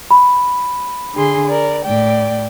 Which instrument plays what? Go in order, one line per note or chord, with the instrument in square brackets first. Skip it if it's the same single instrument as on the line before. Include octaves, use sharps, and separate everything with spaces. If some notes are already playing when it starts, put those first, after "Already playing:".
[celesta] B5
[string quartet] D3 G#4 C6
A#4 D5
A2 D5 G5